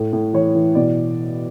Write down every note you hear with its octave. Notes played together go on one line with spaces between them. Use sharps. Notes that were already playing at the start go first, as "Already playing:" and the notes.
Already playing: A2
A2
E3 C#5
E3
B2 D5